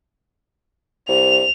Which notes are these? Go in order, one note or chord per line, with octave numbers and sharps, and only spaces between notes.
C2 F7